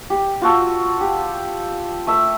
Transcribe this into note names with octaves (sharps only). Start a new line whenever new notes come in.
G4
F4 F#4 A4
G4
A3 E5